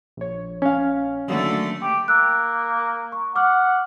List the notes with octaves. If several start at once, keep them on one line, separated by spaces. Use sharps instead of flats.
A#1 C#5
C#4 F5
D3 D#3 F#3 A3 A#3
G4
A#3 E6 F#6
C#6
F#5 D6 F6